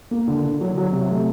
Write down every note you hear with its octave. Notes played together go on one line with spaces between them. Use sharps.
A#3
D3
D3
F#3
F#3
C3
A3